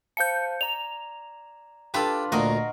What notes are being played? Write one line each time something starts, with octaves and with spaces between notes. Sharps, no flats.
C5 F5 A5 G6 C#7
D5 A#5 F7
D4 F4 G4 A4 B4
D2 A#2 F#4 A#4 D#5 C7